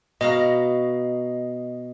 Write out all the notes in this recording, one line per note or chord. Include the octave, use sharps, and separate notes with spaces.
B2 D#5 F5 A#5